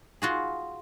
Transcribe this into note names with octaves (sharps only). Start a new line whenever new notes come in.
F4 F#4 G#4